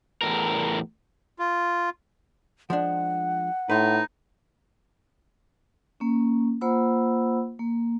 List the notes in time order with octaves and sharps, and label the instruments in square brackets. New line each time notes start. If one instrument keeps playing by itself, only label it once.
[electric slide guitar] E2 A2 A#4
[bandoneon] F4
[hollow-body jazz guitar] F3 G#3 D4 [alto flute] F#5
[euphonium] A2 [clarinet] D#4 [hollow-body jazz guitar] B4 C5
[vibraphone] A#3 C#4
A#3 F4 C5 F#5 B5 E6
A#3